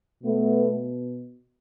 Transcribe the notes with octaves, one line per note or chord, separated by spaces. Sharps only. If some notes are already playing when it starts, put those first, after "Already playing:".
B2 A3 B3